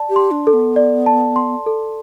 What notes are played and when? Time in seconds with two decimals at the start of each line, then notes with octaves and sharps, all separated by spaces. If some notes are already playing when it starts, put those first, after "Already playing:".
Already playing: D5 A5
0.10 G4
0.16 C6
0.31 D4
0.47 A4
0.53 B3
0.76 D5
1.06 A5
1.36 C6
1.66 A4